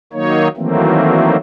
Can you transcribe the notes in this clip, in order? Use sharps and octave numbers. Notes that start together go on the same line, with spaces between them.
D#3 F#3 A#3 D#4 C#5
D#3 E3 F#3 A3 A#3 C4